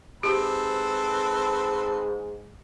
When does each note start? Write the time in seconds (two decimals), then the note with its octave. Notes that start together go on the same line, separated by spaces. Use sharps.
0.23 G#2 C4 G4 A4 B4